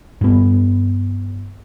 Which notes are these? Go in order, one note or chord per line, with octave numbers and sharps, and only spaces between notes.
G2 B3